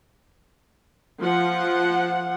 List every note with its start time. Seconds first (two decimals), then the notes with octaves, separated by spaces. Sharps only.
1.20 F3 F#5